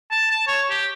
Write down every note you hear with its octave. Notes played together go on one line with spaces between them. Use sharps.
A5
A5
C#5
G4